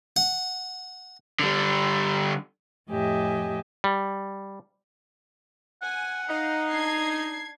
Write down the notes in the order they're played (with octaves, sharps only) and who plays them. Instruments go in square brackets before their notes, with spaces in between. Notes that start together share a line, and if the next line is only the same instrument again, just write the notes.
[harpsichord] F#5
[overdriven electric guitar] D3 G3
[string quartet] F2 A2 G4 D#5 E5 G#5
[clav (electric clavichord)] G3
[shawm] F#5 [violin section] G#5
[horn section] D#4 [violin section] F5
[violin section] D4 G#6 C7